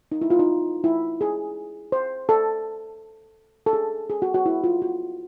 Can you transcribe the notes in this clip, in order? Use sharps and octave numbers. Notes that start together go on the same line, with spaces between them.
D#4
E4
F4
D#4
E4
G#4
C5
A4
A4
G#4
G#4
F#4
F#4
E4
F4
F#4